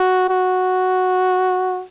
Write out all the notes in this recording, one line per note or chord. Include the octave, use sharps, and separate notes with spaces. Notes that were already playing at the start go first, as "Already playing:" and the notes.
Already playing: F#4
F#4